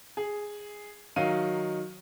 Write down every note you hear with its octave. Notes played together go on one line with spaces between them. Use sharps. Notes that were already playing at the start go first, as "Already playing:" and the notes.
G#4
D#3 F#3 D#4 F5 D#7